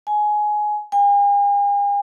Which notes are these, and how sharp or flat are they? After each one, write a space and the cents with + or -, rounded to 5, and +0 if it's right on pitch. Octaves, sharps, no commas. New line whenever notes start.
G#5 +15
G#5 -45